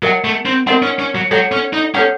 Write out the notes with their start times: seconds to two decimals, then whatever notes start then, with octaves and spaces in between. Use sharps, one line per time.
0.03 F#3 A#4 D#5 F#5
0.24 A3
0.46 C4
0.67 C4 A#4 D#5 F#5
0.82 C#4
0.99 C#4
1.15 F#3
1.31 F#3 A4 C#5 F#5
1.52 C#4
1.73 D#4
1.95 C#4 A4 C#5 F#5